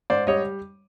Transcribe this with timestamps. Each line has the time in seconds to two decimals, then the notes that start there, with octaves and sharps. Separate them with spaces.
0.10 G#2 C5 D5
0.27 G3 C#5 D#5